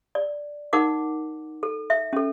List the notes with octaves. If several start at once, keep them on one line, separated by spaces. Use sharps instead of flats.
D5
D#4 A#4 F#5 D6
A4
E5
C#4 A4